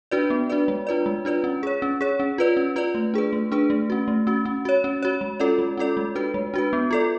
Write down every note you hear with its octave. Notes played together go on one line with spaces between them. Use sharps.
D4 F#4 B4 D5
B3
D4 F#4 B4 D5
G#3
D4 F4 B4 D5
G#3
D4 F4 B4 D5
C#4
G#4 C#5
C#4
G#4 C#5
C#4
F4 B4 D5
C#4
F4 B4 D5
A3
D4 G#4 B4
A3
D4 G#4 B4
A3
C#4 F#4
A3
C#4 F#4
C#4
F#4 C#5
C#4
F#4 C#5
G#3
C#4 F4 A4 D5
G#3
C#4 F4 A4 D5
G#3
D4 F#4 B4
G#3
D4 F#4 B4
B3
F4 A4 D5